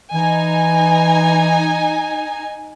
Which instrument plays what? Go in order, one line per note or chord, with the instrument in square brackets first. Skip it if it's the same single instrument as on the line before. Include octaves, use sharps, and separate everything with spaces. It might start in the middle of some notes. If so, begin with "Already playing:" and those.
[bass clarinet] E3 [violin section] D#4 G#5